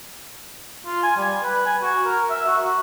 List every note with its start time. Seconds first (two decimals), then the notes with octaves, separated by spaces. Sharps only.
0.86 F4
1.03 G#5
1.17 G3
1.42 B4
1.66 G#5
1.82 F#4
2.05 A#4
2.30 E5
2.47 F#4
2.63 F#4